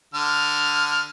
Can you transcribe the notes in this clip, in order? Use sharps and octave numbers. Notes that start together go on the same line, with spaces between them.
D3 F6